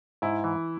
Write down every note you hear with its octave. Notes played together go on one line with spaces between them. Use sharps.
G#2 E4
E3